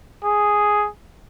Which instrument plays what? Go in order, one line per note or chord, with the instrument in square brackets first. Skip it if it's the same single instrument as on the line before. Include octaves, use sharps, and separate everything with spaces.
[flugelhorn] G#4